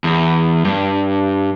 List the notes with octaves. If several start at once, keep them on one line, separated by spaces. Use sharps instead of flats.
E2
G2